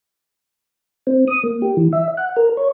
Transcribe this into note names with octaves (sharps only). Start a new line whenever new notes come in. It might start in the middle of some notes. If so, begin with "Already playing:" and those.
C4
D#6
A#3
G4
E3
E5
F#5
A#4
C#5